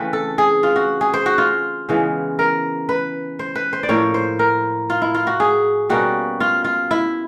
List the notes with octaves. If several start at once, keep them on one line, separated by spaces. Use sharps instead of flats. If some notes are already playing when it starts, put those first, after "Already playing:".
Already playing: C#3 E3 A3 C4 B4
A4
G#4
F4
F#4
G#4
C5
F#4
F4
C#3 E3 G#3 B3
A#4
B4
C5
B4
C5
D5
A2 F3 A#3 C#5
C5
A#4
F4
E4
F4
F#4
G#4
B2 G3 A#3 C#4 F#4
F4
F4
E4